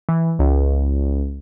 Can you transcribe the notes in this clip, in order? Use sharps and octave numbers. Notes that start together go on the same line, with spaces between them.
E3
C#2